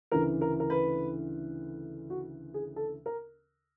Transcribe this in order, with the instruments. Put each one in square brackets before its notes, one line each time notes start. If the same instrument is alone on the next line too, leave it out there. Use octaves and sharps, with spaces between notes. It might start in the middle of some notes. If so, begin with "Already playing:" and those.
[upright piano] D2 C#3 E3 A#4
A#4
A#4
B4
F#4
G#4
A4
A#4